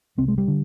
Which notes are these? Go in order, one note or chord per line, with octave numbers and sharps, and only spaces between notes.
C2 C3 C4
G#3
G3
D3